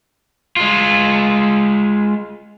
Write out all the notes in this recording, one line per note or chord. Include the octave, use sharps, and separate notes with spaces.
G#3 F4